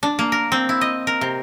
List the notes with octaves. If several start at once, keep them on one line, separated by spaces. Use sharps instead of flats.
D4
A#3
A#4
C4
E4
D#5
A#4
C3